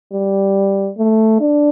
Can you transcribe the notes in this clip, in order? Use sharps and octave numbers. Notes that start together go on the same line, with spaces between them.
G3
A3
D4